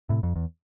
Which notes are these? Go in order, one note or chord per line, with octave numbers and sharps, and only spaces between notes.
A2 C3
F2
E2